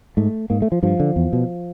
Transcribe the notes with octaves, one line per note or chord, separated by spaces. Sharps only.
G#2 A3
G#2 A#3
A3
F3
G2 F3
D3
E2
B2